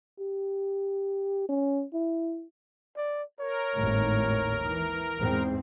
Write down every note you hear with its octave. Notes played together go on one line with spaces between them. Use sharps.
G4
C#4
E4
D5
A#4 C#5
G#1 D#2 A2
E3
E2 G#2 C4